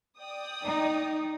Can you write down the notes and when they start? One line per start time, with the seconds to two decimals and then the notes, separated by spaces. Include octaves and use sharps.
0.18 D5 G5 D#6
0.64 D#4